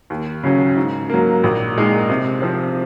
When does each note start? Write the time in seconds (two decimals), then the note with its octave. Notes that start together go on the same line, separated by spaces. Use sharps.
0.10 D#2
0.44 C#3 F#3 C#4
0.76 G#2
1.10 F#3 A#3
1.44 A#1
1.77 A#2 G#3 D#4 A#4
2.10 C3
2.42 F3 C4